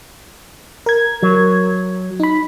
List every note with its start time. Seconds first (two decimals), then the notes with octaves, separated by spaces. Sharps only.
0.86 A#4 G#6
1.23 F#3
2.20 D#4 B5